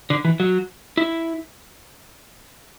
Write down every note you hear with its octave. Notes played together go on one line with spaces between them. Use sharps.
D3
E3
F#3
E4